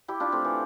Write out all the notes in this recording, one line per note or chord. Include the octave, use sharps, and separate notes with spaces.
E4 G4
D4 F4
A3 C4
E3